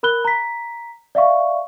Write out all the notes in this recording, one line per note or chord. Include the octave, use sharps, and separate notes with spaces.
A#4 B5 F#6 G7
A#5 B6
D5 E5 F5 C#6